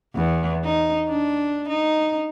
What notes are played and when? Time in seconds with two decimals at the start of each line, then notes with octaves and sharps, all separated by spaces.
0.15 E2
0.65 D#4
1.08 D4
1.68 D#4